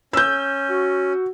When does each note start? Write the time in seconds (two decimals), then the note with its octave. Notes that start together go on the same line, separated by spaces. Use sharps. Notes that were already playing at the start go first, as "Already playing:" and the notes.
0.13 C#4 E6 G6
0.70 F#4